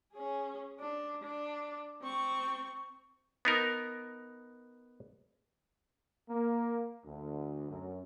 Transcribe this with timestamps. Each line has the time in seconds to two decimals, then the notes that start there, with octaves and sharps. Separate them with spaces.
0.13 C#4 G#4
0.80 D4
1.23 D4
2.02 C4 C#6
3.45 B3 D#4 A#4
6.29 A#3
7.05 D2
7.71 F#2